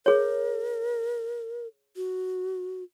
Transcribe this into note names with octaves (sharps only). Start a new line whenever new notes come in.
G#4 A#4 C#5
F#4